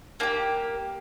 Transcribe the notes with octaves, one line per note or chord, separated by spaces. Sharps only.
A#3 D4 G4